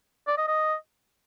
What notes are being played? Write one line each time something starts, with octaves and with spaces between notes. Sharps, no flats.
D5
D#5
D#5